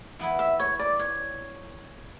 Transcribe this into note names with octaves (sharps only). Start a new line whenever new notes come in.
E3 B3 E4
E5
C#5
D5
C#5